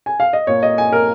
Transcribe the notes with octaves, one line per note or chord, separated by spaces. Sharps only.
G#5
F5
D#5
A#2 A#3 C#5
D#5
G#5
A#4